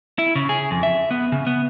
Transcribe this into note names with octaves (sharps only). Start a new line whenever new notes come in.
E4
C#3
G#4
F2
E5
B3
C#3
B3